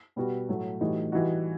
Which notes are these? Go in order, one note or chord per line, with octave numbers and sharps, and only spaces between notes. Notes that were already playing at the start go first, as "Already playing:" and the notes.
B2 G3 B3 F#4
A2 F#3 A3
A2 E3 G3 D#4 F#4
E3 G3 D#4 F#4